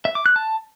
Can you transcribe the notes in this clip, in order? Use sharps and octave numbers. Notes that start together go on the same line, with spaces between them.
E5
D6
F#6
A5